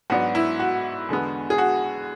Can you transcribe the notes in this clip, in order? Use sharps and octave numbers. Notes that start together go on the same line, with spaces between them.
G#2 F#3 B3 D4 F#4
E4
F#4
E2 D3 G#3 B3
G#4
F#4